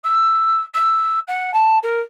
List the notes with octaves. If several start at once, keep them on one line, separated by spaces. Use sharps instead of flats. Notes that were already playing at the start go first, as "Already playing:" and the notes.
E6
E6
F#5
A5
A#4